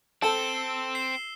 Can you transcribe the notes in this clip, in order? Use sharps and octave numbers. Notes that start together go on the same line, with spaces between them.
C4 A4 A5 E6 E7 G7
C7